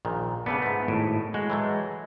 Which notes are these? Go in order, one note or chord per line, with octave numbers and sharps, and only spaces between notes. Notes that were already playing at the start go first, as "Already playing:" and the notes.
A#1 A#2 D#3
C#3 A3 B3 D4
G#2 A3
G#1 A2
G#3 F#4
E3 F#3 A3